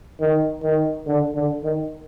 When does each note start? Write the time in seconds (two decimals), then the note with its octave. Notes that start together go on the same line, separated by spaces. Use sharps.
0.20 D#3
0.63 D#3
1.07 D3
1.35 D3
1.64 D#3